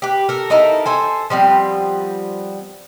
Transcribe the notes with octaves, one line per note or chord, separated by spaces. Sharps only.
G4 B4
A4 A#4
D#4 E4 A4 A#4
A4 C5 G#5
F3 G3 B3 C4